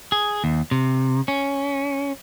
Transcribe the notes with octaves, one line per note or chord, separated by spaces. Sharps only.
G#4
D#2
C3
C#4